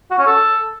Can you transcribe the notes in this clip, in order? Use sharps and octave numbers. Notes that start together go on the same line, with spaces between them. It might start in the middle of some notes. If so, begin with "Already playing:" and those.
F#4
C#4
A4